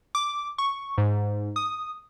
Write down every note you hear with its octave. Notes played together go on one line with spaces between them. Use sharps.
D6
C#6
G#2
D#6